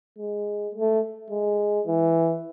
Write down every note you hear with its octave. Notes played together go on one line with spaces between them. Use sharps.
G#3
A3
G#3
E3